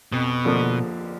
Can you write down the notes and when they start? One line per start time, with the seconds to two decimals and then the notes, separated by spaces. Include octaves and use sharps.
0.12 F2 B2
0.45 D3 F3 A#3